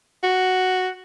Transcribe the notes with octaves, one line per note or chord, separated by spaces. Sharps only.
F#4